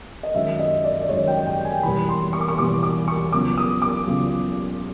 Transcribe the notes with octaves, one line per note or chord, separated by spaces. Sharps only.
D#5
F#2 D#3 G#3 E5
D#5
D5
D5
F#2 D#3 G#3 C#5
G5
G5
G#5
E1 E2 B2 G3 B5
C6
C#6
D6
C#6
E1 E2 B2 G3 D6
D6
C#6
C#2 C#3 F#3 B3 D6
D#6
D6
C#2 C#3 F#3 B3